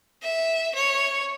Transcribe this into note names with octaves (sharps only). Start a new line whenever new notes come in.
E5
C#5